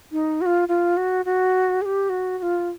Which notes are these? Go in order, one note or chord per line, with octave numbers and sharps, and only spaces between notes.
D#4
F#4
F4
F4
F#4
F#4
G#4
G4
F#4
F#4
F4